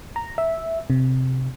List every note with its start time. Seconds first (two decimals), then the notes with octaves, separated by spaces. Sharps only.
0.16 A#5
0.38 E5
0.90 C3